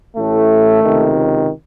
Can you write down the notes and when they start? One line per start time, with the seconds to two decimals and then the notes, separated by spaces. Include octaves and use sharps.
0.17 A1 A2 A3
0.84 C#2 C3 D#3